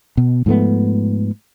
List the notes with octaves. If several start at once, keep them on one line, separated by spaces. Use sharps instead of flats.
B2
G#2 F3 A3 B3